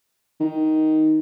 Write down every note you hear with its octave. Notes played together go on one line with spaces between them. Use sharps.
D#3